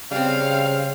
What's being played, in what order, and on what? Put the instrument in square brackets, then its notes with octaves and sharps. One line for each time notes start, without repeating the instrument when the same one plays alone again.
[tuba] C#3 [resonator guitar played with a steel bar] G3 C4 [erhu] F5